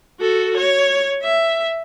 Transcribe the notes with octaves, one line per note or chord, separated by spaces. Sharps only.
F#4 A4
C#5
E5